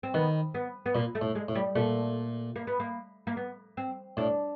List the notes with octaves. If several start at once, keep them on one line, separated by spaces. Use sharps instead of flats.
C4
D#3 B3
B3
B3
A#2 A#3
A3
A2
G#3
A2
G3
A#2 A3
A#3
B3
A#3
A#3
B3
C4
A2 D4